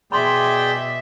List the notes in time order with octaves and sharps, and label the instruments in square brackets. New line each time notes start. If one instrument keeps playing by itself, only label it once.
[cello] B2 E5 [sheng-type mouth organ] G#4 D5 G5 [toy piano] B5 C6